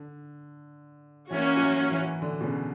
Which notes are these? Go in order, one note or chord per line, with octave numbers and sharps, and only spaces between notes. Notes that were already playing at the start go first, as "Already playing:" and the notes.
Already playing: D3
E3 A#3 C#4 F#4
F#3
E3
E3
D3
B2
C#3